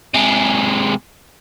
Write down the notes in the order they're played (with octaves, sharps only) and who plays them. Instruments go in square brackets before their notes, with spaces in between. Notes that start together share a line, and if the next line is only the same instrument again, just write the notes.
[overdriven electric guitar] C3 G#3